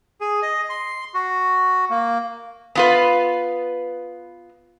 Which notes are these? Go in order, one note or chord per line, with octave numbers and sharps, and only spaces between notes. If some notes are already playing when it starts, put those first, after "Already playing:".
G#4
D#5
C6
F#4
A#3
B3 F4 B4